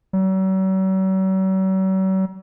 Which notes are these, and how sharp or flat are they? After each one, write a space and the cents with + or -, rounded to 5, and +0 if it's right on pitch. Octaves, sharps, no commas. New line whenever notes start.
F#3 +45